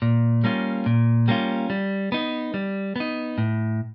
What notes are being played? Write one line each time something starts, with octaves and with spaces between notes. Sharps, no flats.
A#2
G3 A#3 C#4 F4
A#2
G3 A#3 C#4 F4
G3
B3 D#4
G3
B3 D#4
A2